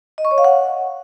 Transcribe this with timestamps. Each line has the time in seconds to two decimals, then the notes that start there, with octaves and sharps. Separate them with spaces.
0.18 D#5
0.25 C#6
0.31 C#5
0.38 F5
0.44 F#5